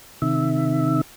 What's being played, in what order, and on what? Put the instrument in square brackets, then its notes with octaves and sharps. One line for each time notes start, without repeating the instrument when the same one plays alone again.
[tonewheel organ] C3 D#3 E5